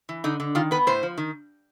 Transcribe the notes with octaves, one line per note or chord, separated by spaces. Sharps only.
E3
D3 D#4
D3
D#3 F4
B3 B4
A2 C5
F3
D#3